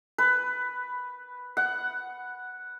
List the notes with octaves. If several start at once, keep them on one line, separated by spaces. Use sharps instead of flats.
B4
F#5